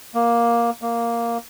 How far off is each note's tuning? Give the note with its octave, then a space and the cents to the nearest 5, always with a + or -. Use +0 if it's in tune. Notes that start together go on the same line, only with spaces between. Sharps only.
A#3 +10
A#3 +0